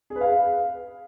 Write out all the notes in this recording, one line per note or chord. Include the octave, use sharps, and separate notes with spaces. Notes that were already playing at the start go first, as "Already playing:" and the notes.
G#4
B4
F5